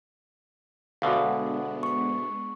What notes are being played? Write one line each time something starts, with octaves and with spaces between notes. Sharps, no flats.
D2 B2 D3 G#3 B3 D4 F5
C#6